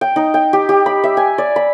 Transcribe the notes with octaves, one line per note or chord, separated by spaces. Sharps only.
G5
D#4
G5
G4
G4
B5
E5
G#5
D5
B5